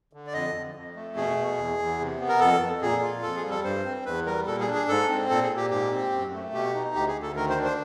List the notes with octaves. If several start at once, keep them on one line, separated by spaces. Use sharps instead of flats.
D3
D5
F2 D#5
F2
F2
A3
B2 G#4
B2
E2
E2
C3
B3
A#4
F2 A4
F2
A#2 G#4
F4
F2 A4
G#4
G3
A4
G2 C5
C4
E2 B4
G3 A#4
A#2 A4
G#4
D4
G#4
G#2 A4
C4
A#2 A4
G#4
A#2
G4
G#2 G4
C4
F#2
A3
B2 G4
D#4
D2 G4
G#4
D2
A4
D#3 A#4
C5
D4
C5